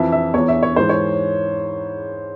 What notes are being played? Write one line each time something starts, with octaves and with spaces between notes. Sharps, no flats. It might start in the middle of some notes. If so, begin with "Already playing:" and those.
Already playing: F2 E3 E5
E5
E2 E3 C#5
E5
C#5
G#2 E3 C5
C#5